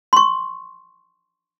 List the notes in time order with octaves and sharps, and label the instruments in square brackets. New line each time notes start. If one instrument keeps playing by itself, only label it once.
[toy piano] C6 C#6